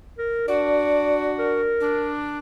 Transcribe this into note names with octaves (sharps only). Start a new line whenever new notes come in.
A#4
D4 F#4 D5
A#4
D4